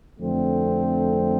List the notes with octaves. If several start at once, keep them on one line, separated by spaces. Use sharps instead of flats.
F2 D3 A3 C4